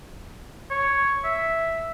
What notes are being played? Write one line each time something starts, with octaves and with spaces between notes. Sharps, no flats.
C#5
E5